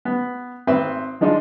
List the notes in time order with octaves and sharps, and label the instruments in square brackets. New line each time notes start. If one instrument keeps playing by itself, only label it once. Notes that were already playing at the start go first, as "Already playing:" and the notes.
[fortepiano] B3
G#1 C4 B4 E5 C6
F3 G#3 D4 D#4 F4